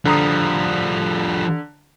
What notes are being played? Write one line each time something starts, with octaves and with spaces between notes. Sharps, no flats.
D3 F3 G3 A#5 D#6